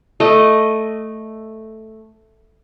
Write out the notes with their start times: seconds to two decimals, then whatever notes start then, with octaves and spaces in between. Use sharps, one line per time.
0.20 A3 D#5